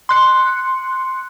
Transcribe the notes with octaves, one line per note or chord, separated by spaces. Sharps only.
C6 F#6 C#7